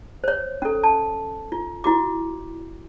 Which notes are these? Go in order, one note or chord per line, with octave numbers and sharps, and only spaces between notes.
C5 C#5
C#4 A4
A5
F4
E4 F#4 D6